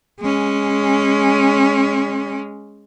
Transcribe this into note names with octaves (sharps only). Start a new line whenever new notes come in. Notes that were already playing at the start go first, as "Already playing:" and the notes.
G#3 C#4